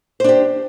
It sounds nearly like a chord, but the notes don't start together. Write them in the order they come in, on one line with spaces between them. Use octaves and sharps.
C5 D4 G4